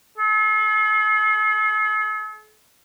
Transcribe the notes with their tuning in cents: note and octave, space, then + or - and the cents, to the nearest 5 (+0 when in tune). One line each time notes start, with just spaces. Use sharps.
A4 -45